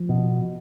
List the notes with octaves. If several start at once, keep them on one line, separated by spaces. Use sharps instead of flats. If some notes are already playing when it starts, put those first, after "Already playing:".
Already playing: F3
B2